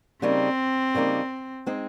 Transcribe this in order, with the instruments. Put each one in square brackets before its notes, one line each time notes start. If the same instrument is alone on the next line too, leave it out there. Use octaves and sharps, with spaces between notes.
[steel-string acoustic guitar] C#3 G3 A#3 D#4 [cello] C4
[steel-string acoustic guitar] C#3 G3 A#3 D#4
G#3 C4 D#4